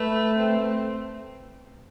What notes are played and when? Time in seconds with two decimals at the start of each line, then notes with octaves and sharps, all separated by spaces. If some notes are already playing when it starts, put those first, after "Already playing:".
Already playing: A3 B4
0.36 C4